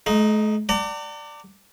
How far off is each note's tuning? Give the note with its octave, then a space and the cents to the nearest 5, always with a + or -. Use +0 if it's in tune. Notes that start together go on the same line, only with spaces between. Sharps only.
A3 -45 D#4 +0
D5 +0 F#5 +45 A#5 -45